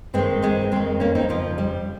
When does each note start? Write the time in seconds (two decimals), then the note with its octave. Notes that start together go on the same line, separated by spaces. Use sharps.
0.14 G2 D#3 G#3 C4
0.42 G#3 C4
0.71 F2 D#3 G#3 C4
1.00 A#3 C#4
1.15 C4 D#4
1.29 F2 C#3 F3
1.58 G3